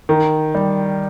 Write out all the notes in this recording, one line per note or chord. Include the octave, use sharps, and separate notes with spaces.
D#3
G3